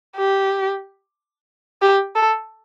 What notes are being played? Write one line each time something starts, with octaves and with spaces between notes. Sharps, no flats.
G4
G4
A4